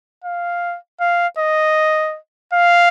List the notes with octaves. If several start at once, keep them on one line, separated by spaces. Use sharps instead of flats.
F5
F5
D#5
F5